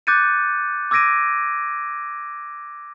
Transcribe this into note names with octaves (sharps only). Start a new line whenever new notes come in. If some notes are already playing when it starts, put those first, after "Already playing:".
D6 F#6 G6 A6 C#7 D#7
D6 E6 G#6 A#6 D7 D#7